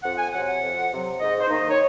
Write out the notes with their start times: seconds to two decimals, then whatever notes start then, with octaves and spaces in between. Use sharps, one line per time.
0.03 F2 F#5
0.18 G#5
0.32 C3 F#3 F#5
0.46 F#5
0.61 F2
0.91 C3 F#3
1.20 G#2 D#5
1.40 C5
1.49 D#3 A#3 D#4
1.59 D#5
1.70 C#5